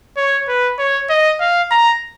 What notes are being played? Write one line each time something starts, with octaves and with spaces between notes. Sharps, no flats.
C#5
B4
C#5
D#5
F5
A#5